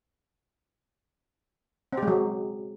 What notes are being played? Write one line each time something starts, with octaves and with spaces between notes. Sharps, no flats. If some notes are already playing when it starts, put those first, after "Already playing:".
F#3 G#3 C4 G4